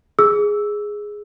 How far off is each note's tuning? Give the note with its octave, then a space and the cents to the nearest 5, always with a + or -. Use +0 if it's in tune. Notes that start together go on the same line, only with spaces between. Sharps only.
G#4 +0 E6 +0